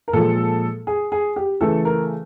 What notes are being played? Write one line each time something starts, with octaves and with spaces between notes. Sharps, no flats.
A#4
A#2 F3 G#3 A4
G#4
G#4
G4
C#3 E3 A3 A4
A#4